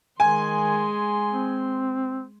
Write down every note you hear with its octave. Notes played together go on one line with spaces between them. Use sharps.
D#3 G#3 G#5 C6
C4